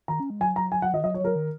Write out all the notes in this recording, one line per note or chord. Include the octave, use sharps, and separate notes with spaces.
D#3 A#5
C#4
G#3
F#3 G#5
F#3 A#5
F#3 G#5
F#3 F#5
D#3 D#5
F#3 D#5
C#5
F#3 A#4
D#3